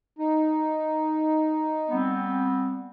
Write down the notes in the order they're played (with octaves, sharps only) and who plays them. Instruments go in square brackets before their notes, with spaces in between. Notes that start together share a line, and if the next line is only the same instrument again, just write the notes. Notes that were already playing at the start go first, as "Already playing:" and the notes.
[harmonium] D#4
[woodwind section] G3 B3 C4